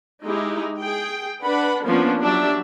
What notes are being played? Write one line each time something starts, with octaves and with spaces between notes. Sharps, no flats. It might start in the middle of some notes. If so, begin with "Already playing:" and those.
G#3 D#4 E4 G4
G#4 G5
D4 B4 F#5 B5
F3 A#3 B3 C#4 D4
F#3 D4 G4 E5